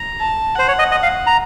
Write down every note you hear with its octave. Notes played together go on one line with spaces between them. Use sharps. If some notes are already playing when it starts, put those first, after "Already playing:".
Already playing: A#5
A5
C5 F#5
C#5
D#5
D#5
F5
A#5